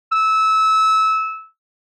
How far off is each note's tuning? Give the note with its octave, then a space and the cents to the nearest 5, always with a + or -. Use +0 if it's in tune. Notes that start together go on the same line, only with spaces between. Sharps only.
E6 -20